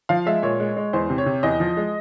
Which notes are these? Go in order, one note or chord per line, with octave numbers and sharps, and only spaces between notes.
F3 F5
G#3 E5
A#2 C#5
G#3
G#3
E2 C5
C3
C#5
C3
E2 D#5
F3
G#3